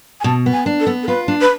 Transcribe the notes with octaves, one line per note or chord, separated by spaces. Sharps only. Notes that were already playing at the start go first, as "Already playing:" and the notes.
G#5
B2 A5
B3
G#5
D4
A4
B3
A4
F4 B4
D4
B4